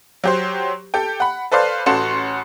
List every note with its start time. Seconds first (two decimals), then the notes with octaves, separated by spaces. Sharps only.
0.24 F#3 G4 C5
0.94 G4 A4 G5
1.20 F#5 B5
1.52 A4 B4 C5 D5 F5
1.86 A1 C#4 F#4 A4 C6 E7